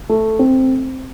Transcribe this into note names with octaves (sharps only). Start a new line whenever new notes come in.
A3
C4